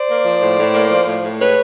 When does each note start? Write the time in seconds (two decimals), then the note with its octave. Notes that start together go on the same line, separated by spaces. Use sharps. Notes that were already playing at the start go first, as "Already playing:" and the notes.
Already playing: C5 D5
0.10 A#3
0.26 F3
0.42 A2
0.58 A2
0.74 A#3
0.91 F3
1.06 A2
1.23 A2
1.39 G#3 B4 C#5